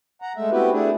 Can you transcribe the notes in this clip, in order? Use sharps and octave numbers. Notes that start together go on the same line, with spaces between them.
F#5 A#5
G#3 A3 E5
B3 C4 E4 F#4 G4 B4
A3 D4 E4 G#4